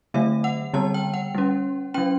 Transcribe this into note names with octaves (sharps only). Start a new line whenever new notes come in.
D3 F#3 A3 E5
F#5
D3 G3 B3 A5
G5
F#5
G3 C#4
F#3 C#4 G5